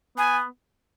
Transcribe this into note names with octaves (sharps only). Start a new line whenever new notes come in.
B3 G#5